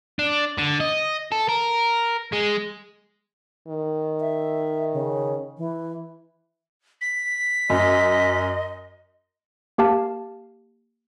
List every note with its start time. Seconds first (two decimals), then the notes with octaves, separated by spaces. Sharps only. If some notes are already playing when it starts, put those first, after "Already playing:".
0.19 D4
0.58 D3
0.80 D#5
1.32 A4
1.49 A#4
2.33 G#3
3.68 D#3
4.20 E5
4.93 C#3
5.57 E3
7.01 B6
7.70 F#2 D#5
9.78 A#3 G4 F5 A5